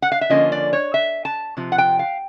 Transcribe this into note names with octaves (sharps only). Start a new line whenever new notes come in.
F#5
F5
E5
D3 F3 A#3 C#4 D#5
D5
C#5
E5
A5
C3 F3
F#5
G5
F5